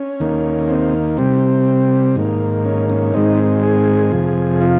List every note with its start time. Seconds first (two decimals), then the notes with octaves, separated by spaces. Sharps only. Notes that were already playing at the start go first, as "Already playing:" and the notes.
Already playing: C#4
0.20 D#2 D#3 A#3
0.68 C4
1.17 C3 G3 C4
2.16 G#2 D#3 A#3
2.65 C#4
2.90 C#4
3.14 G#2 D#3 G#3 C4 D#4
3.63 G#4
4.11 F2 C3 F3
4.61 F4